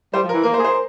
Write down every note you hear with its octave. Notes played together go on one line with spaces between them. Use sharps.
G3 C5
F3
A#4
E3
A#3 A#4
C5
G#4
C5